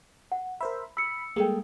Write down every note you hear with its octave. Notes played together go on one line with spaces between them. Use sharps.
F#5
A#4 C5 E5 B5
B5 E6 C#7
G3 G#3 A#3 G#4 A4 G5